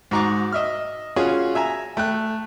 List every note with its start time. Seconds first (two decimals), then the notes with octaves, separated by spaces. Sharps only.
0.11 G#2 F#4 A#5 C#6 D6
0.52 D#5 E5 F6
1.16 C#4 F4 F#4 G#4
1.55 E5 G#5 A#5
1.97 A3 G5 F#6